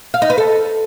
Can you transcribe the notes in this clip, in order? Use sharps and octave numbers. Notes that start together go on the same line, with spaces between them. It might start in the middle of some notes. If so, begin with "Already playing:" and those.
F5
D#4
B4
A4